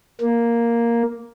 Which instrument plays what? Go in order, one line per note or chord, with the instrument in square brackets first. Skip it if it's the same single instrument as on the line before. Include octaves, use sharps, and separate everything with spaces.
[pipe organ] A#3